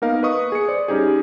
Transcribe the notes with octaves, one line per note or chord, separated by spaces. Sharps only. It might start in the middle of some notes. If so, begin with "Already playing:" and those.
A#3 B3 D#4 A#4 F5
B4 D#5 C#6 D#6
G#4 C#7
C5 D5
G3 C#4 D#4 G4 G#4